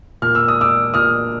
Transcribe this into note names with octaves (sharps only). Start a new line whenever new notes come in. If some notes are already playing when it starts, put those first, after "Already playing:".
A#2 F6
E6
D#6
D6 E6
A#2 D#6 F6